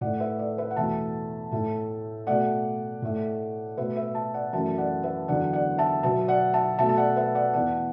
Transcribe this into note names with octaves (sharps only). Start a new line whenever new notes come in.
A2 A3 D5 F#5
B4 E5
A4 D5
B4 E5
F#5
E2 B2 A3 E5 A5
A2 A3
B2 A3 D5 F#5
A2 A3
B2 A3 B4 E5
B4 E5
E5 A5
D5 F#5
F#2 E3 A3 E5 A5
D5 F#5
B4 E5
E2 D3 F#3 B3 D5 F#5
D5 F#5
E5 A5
B2 F#3 B3 E5 A5
D5 F#5
E5 A5
B2 A3 E5 A5
A5
D5 F#5
B4 E5
D5 F#5
E2 E3 B3 D5 F#5